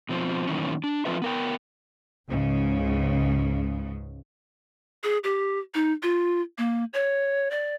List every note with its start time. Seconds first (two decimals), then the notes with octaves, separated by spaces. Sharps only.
0.09 B2 F3 C4
0.47 F#2 A#2 D#3 E3 C#4
0.84 D4
1.05 F3 C4 F4 B4 E5
1.22 B3 A#4 G5
2.28 C#2 G#2 C#3
5.04 G#4
5.24 G4
5.74 D#4
6.03 F4
6.58 A#3
6.93 C#5
7.51 D5